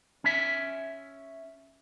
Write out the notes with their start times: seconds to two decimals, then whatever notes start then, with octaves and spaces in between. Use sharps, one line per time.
0.24 C#4 E5